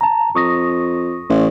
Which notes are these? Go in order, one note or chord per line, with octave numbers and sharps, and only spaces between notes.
A5 A#5
F2 C#6 D#6 A#6
A1